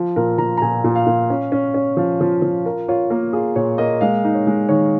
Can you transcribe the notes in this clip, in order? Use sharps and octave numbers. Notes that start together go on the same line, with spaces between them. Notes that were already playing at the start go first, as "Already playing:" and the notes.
Already playing: F3
A#2 A#4
F3 A#5
A#5
A#2 G#5
A#2
F5
A#2
C#4
C#4
C#4
F3 F5
F3
F3
F4 A#4
F4 C#5
A#3 A#4
F4 G#4
A#2 C#5
A#3 D#5
G#3 F5
D#4
C#5
G#3
D#3 C#5